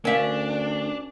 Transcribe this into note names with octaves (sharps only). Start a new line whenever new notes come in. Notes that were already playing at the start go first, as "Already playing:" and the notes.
D2 C#4 D4 A#4 E5 F5